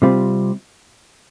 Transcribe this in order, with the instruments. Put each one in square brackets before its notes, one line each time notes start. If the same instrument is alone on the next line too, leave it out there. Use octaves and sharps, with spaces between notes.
[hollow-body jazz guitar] C3 G3 C4 F4